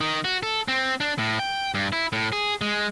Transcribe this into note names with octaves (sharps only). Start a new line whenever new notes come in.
D#3
F#4
A4
C4
D4
A2
G5
G2
E4
A2
G#4
G#3